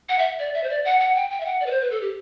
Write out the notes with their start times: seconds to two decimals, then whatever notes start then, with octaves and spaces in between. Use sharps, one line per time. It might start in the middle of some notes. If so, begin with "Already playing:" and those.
0.09 F#5
0.19 E5
0.39 D5
0.54 E5
0.64 C5
0.70 D5
0.85 F#5
1.00 F#5
1.15 G5
1.31 G5
1.40 E5
1.46 F#5
1.61 D5
1.66 B4
1.71 C5
1.81 B4
1.91 A4
2.01 G4